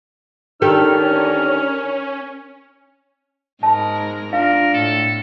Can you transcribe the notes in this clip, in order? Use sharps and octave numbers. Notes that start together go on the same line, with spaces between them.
D2 D#3 C#4 D4 G4 A4 A#4 F6
G#2 G#3 A#4 A5 B5
D4 F4 A#4 F5
A2 A4